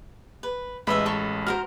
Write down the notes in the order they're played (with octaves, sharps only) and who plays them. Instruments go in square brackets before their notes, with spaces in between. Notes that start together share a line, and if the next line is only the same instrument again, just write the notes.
[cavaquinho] B4
[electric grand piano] A1 G#3 B5 [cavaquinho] B4 D#5 E5
[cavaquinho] A4 C#5 C#6
[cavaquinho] F#4 A#4 C5 [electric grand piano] F6